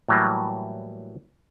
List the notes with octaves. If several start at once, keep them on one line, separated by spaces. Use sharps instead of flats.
A2 E3 F#3 G3 A#3